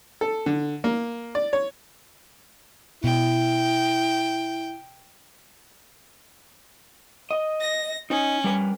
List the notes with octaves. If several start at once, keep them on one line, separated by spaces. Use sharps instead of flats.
A4
D3
A#3
D5
C#5
B2 E4 G5
D#5
A#6
C#4 D#4
G3 A#4 B4